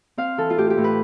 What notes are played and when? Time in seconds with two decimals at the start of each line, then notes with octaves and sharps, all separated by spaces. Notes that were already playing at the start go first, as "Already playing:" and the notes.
0.17 C4 F5
0.38 E3 A4
0.50 F4
0.57 A2 G4
0.70 G4
0.78 A2
0.84 B4